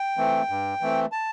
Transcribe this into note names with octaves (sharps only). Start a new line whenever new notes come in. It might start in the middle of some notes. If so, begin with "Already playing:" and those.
Already playing: G5
E3 A3 C4
G2
E3 A3 C4
A5